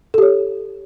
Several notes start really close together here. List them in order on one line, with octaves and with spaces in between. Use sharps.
A4 G4 C#5